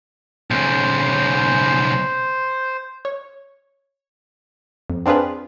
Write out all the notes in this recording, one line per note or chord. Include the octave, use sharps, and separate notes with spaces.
B1 C#3 C5
C#5
F2
C4 D4 F4 G#4 B4